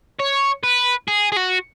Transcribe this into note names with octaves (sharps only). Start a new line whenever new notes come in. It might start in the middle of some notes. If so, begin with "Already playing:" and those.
C#5
B4
G#4
G#4
F#4